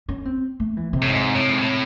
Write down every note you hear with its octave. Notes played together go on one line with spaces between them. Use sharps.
C#4
C4
A3
E3
C3
A2
G#2
A2
G#2
A2